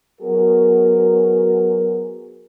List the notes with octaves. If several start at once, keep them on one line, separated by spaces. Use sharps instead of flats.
F#3 B3 F#4 G#4 A#4